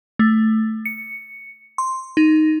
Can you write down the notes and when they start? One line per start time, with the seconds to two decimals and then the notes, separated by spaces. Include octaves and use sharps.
0.19 A3
0.86 C#7
1.78 C6
2.17 D#4